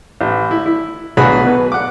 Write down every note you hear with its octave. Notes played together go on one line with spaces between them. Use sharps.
A1
E4
E4
B1 F#3 D4 F#4 G#4 B5
B2 B4
F#5 D6